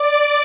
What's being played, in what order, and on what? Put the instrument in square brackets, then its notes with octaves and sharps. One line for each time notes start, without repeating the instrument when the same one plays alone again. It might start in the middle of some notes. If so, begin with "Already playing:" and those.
Already playing: [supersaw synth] D5 D6